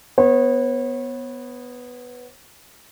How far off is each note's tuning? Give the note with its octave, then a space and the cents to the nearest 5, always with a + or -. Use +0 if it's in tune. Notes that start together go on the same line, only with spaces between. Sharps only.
B3 +0 C#5 -35